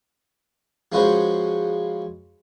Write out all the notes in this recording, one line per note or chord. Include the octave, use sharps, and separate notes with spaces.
F3 G#3 C#4 F#4 B4 C5